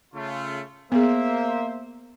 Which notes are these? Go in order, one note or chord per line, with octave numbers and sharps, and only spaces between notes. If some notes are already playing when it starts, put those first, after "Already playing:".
C#3 A3 F4
A#3 B3 G#4 C5 E5